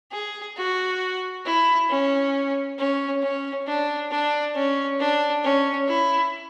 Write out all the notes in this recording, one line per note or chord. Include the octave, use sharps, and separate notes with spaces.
G#4
F#4
E4
C#4
C#4
C#4
D4
D4
C#4
D4
C#4
E4